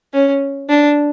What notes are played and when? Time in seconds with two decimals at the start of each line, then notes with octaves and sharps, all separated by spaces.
0.14 C#4
0.69 D4